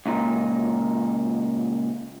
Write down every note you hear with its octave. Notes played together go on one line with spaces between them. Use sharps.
C#2 A#2 D#4